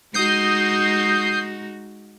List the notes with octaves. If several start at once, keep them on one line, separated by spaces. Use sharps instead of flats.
G#3 D#4 F#4 D#6 G6 C7